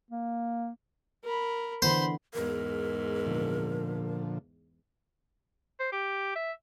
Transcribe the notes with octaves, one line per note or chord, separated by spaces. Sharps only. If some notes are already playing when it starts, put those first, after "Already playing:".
A#3
A#4 B5
D3 E3 B3 C5 B5 C6
E2 G#2 A#4
A#2 D3 F3
C5
G4
E5